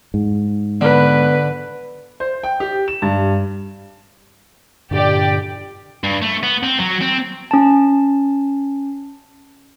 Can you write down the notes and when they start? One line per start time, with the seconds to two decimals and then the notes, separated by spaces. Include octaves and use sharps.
0.14 G#2
0.81 D3 B3 B4
2.20 C5
2.43 G5
2.60 G4
2.88 E7
3.02 G2
4.91 G2 A#2 D3 G4 D5 G5
6.03 G2
6.22 A3
6.43 B3
6.64 C4
6.79 F#3
7.02 C4
7.51 C#4 A5